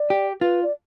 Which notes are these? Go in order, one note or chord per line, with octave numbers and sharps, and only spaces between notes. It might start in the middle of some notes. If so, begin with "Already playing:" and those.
Already playing: D5
G4
F4 B4
D5